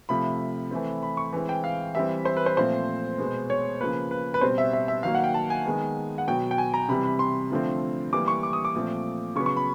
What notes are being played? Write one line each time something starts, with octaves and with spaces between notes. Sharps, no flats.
C3 F3 A3 B5
E3 A3 C4
B5
C#6
E3 G#3 C4
G5
F5
E3 G3 C4 E5
C5
B4
C5
A#2 F3 A3 C4 C5
B2 G#3 B3
C#5
C#3 F3 A#3 B4
B4
B4
B2 G3 C4 C5
E5
E5
E5
D#3 F#3 A#3 F5
F#5
G5
A5
G#5
D#3 G#3 B3
F#5
B2 F#3 B3 G5
G5
G#5
A#5
C3 E3 G3 B5
B5
C6
D3 F3 A3 C4
E3 G3 A#3 D6
C#6
D6
D#6
D6
A#2 F3 A3 C4
C#3 F#3 B3 C#6
C#6
B5